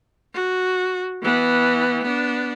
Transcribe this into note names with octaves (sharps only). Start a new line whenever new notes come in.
F#4
E3 B3
B3 D4